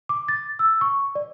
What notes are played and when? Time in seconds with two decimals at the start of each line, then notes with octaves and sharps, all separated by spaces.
0.09 D6
0.28 A6
0.59 E6
0.81 C#6
1.15 D5